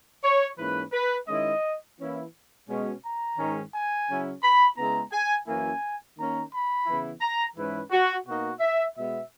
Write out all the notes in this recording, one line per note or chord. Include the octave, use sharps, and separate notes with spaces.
C#5
G#2 E3 A#3 C#4 B4
B4
D#3 G#3 C#4 E4 D#5
E3 A#3 C#4 E4
B2 G#3 C#4
A#5
G#2 D#3 G#3 C#4
G#5
C#3 F#3 C#4 E4
B5
C#3 G#3 B3 E4 A#5
G#5
F#2 E3 A#3 C#4 E4 G#5
D#3 A#3 C#4 A#5
B5
C#3 E3 B3 E4
A#5
G#2 E3 G#3 C#4 E4 B4
F#4
B2 A#3 D#4 F#4
E5
B2 G#3 B3 E5